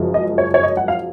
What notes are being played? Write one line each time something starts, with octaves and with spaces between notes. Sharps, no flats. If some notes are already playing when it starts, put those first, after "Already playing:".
Already playing: F#1 F#2 F3 G#3
D#5
C#5
C#5
D#5
F#5
F5